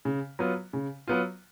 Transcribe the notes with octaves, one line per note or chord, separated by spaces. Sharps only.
C#3
F#3 B3 F4
C#3
F#3 B3 F4